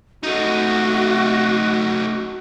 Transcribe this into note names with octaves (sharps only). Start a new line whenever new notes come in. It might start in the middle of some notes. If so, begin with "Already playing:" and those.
A3 D#4 F#4